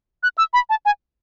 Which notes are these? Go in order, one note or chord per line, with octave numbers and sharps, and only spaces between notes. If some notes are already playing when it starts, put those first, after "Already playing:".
F#6
E6
B5
A5
G#5